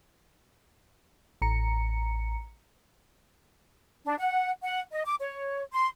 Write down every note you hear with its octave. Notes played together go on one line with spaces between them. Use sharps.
A1 A#5 C#7
D4
F#5
F#5
D#5
D6
C#5
C6